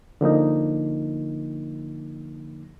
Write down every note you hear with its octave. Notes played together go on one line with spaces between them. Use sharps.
D3 F3 A#3 D#4